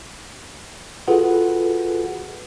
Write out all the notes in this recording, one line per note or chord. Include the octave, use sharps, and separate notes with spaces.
F4 F#4 G#4 A4 B4 F#5